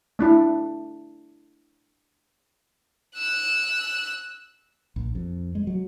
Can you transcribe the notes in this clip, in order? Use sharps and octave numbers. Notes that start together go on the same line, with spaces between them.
A3 D4 E4
E6 F#6
A#1
F2
G#3
F#3